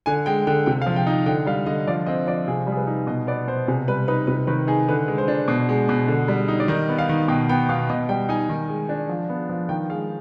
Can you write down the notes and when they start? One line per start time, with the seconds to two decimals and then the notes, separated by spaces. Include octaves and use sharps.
0.06 D3 G#5
0.26 G#3 G5
0.47 D3 G5
0.66 C3 G5
0.82 F5
0.86 F3
0.96 G5
1.06 D#4
1.26 D3 G5
1.46 G3 F5
1.67 D3 D#5
1.88 F3 D5
2.06 C4 D#5
2.27 F3 D5
2.48 C3 G#4
2.67 G3
2.72 G#4
2.77 B4
2.87 D#4
3.07 B2 D#5
3.27 B3 D5
3.47 B2 C5
3.67 C3 G#4
3.88 G3 B4
4.08 D#4 B4
4.27 C3 B4
4.47 D#3 B4
4.67 D#4 G#4
4.88 D3 B4
5.08 G#3
5.18 C5
5.28 D4
5.48 B2
5.69 G#3
5.89 B2
6.08 D3
6.28 G3
6.48 D#4
6.60 D5
6.68 D#3 D#5
6.89 B3
6.98 F5
7.09 D#3
7.28 B2 G5
7.49 B3 G5
7.69 B2 F5
7.90 B2 D#5
8.09 G3 G5
8.29 D#4 G#5
8.50 D#3
8.69 G#3
8.89 D4
9.09 F3
9.29 B3
9.49 F3
9.69 D#3 G5
9.89 G#3 F5